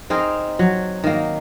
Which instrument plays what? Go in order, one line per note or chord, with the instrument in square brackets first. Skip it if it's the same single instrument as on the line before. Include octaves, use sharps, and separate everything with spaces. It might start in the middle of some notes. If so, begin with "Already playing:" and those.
[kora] C4 D#4 G#4 A#4
F#3
D#3 A#3